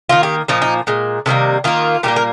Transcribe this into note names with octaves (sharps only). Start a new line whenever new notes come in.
D#3 A#3 F4
G4
A#2 F3 A#3 D#4
D#4
A#2 G#3
C3 D#3 G3 A#3
D#3 A#3 F4
A#2 G3 A#3 G4
A#4